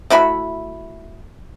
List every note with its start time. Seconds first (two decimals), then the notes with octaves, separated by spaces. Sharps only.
0.10 A3 E4 F#4 B5